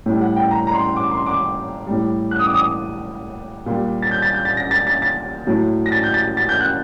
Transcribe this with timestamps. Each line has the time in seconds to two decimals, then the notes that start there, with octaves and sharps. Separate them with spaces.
0.06 A2 G3
0.21 F#5
0.36 G5
0.51 A#5
0.67 A#5
0.73 C6
0.96 D6
1.11 C6
1.26 D6
1.87 A2 G3
2.31 F#6
2.39 D#6
2.47 D6
2.54 D#6
3.66 A#2 G3
4.02 A6
4.11 G6
4.22 A6
4.34 G6
4.45 A6
4.57 A#6
4.71 A6
4.87 A6
5.02 A6
5.47 A2 F#3
5.86 A#6
5.92 A6
6.04 G6
6.14 A6
6.37 A6
6.49 G6
6.61 F#6